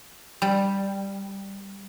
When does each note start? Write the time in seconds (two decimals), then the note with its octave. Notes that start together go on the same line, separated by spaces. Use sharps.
0.42 G3